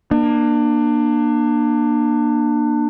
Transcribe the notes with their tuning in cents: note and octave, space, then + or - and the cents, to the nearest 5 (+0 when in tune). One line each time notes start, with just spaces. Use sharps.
A#3 +20 D4 +30